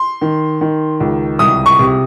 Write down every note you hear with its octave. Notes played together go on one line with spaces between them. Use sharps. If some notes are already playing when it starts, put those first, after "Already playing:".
Already playing: C6
D#3
D#3
C#2
C2 D#6
C#6
C3